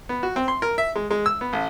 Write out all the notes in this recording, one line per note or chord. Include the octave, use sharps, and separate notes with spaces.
B3
F#4
C4
C6
A#4
E5
G#3
G#3
E6
B3
A1